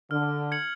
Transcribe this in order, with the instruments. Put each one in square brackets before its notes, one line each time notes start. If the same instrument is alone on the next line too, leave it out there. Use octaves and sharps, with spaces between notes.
[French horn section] D3 [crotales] F6
[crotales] G#6 C#7 F#7